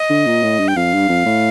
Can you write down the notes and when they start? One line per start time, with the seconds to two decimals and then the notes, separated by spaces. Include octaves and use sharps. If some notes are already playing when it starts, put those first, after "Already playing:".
Already playing: D#5
0.10 D3
0.27 A#2
0.43 A2
0.59 G2
0.68 G5
0.76 F2 F5
0.93 G2
1.09 F2
1.26 A2